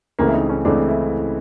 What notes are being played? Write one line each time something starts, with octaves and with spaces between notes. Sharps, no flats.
C#2 C#3 E3 A3 A#3 C4
E4
D#4
C#4
C#2 C#3 E3 A3 C4 D4
E4